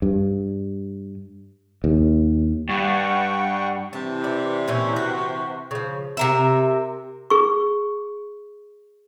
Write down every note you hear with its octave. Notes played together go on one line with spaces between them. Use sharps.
G2
D#2
G2 F#5 G5 C#6
C3 E3 A5
D5
A#2 C#4 E4
F#4
C#3 F3
C3 A#4 E5
G#4 C#6